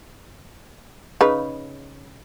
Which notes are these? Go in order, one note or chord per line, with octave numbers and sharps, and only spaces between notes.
C#3 D#4 B4